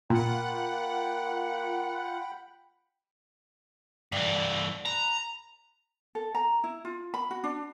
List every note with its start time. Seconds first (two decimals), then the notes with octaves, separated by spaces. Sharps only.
0.10 A#2 A#3 F4 F#5 G5 B5
4.12 G2 D3 E3
4.85 B4 A#5
6.15 A4
6.35 A#5
6.64 E4
6.85 F4
7.14 B5
7.31 F#4
7.44 D4